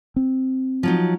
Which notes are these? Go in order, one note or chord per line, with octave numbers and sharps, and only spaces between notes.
C4
F3 F#3 D#4